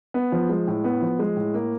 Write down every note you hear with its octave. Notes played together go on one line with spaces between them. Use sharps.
B3
F3
G#3
A2
B3
F3
G#3
A2
A#3